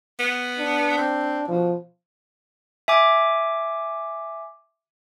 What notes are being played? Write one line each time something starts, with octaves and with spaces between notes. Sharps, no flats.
B3
D4
C4
B2 F3
E5 G#5 D6